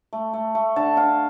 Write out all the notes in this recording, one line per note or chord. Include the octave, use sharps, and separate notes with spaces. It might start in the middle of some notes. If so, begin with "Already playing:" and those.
A3
A3
A3
D3 A5
D3 F5